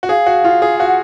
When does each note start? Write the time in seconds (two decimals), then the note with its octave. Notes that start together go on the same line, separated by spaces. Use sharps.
0.03 F#4
0.09 G#4 F5
0.27 F#4
0.44 F4
0.62 G#4
0.80 F#4 F5
0.88 F#5